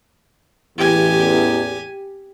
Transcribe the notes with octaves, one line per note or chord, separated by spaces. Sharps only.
A1 E2 G4 G#5